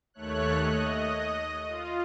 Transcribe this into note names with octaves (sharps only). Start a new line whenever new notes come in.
D#2 A3 C#5 F#6
D#5
F4